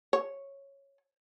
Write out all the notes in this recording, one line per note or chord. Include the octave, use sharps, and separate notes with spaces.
C#5